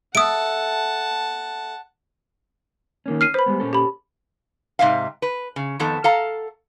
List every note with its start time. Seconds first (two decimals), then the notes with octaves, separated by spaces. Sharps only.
0.15 A4 E5 F#5 A5 D#6 D7
3.06 D#3 A#3 C#4
3.21 F6 C7 D#7
3.34 B4 C5 B5
3.46 G3 G#3 B3
3.60 A#2 C#4 A4
3.73 G4 B5
4.79 G#2 C3 E5 F5
5.22 B4
5.56 C#3
5.79 F2 D#3 B3 A4
6.04 A4 F5 A#5